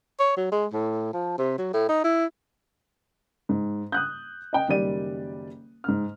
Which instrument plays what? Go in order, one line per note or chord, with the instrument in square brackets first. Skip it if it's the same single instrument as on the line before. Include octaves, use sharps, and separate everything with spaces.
[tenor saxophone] C#5
F#3
G#3
A2
F3
C3
F#3
A2
D#4
E4
[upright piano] G#2
D#6 F#6 G6
D#5 G5
F#1 D#3 G3 G4 D5 D#7
G#2 F6